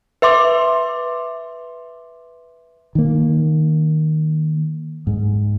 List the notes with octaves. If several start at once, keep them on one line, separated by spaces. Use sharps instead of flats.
B4 E5 C6 D6
D#3 A#3
G#2 G#3